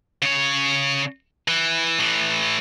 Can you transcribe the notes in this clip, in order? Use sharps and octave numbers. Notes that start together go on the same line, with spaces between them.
C#3 C#5
E3
A2 E3